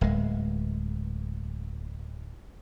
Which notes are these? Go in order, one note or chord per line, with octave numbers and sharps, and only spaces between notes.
D1 G#3